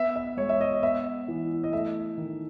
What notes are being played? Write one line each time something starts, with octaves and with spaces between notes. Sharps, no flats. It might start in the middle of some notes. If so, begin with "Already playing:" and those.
Already playing: B3 E5
E5
G#3 C#5
E5
D#5
B3 E5
E3
D#5
A3 E5
D#3